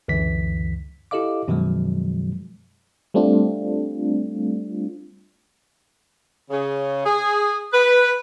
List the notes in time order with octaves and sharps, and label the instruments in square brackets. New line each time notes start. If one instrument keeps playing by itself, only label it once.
[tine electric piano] C#2 F#2 D3 E3 B6
E4 G4 A4 D#5 F5 D6
F#2 B2 D#3 F3 F#3 G#3
[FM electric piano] G3 A3 C4 D4 F4
[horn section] C#3
G#4
B4